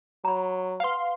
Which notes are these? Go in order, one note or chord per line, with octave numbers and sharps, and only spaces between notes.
F#3 A#5 B5
B4 F5 F#5 C6